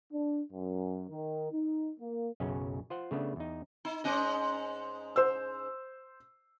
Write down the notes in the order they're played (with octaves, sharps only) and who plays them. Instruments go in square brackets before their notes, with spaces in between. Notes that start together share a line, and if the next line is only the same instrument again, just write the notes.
[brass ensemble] D4
F#2
D#3
D#4
A#3
[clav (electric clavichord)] B1 F#2 C#3 C#4
F4 C5 F#5
C#3 A3 B3 D4
E2 D#4
[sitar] D#4
G#2 C#4 D#5
[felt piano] C5 E6